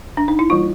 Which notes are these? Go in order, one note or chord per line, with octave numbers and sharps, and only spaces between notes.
D4
D#4
E4
E3 G3 A#3 F4